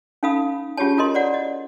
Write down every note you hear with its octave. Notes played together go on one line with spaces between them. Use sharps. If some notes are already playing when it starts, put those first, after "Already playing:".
C#4 D#4 A4 F5 B5 D#6
C#4 F4 G4 G#4 C#5 A5
E4 F4 A4 A#4 D#5 C6
C#5 D5 F#5
D#5